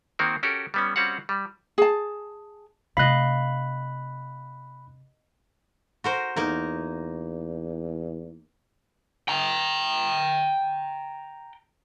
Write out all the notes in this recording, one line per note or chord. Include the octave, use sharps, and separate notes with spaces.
D#3 A#3 C4 F#4 A#4
C#4 F#4 G4 A4 A#4
G3 B3 C#4
G3 C4 C#4 F#4 F5 F#5
G3
G#4 A5
C3 A3 D#5 F5 B5 F#6
F#4 A#4 C5
E2 A#3 D#4 A#4
G5 A#5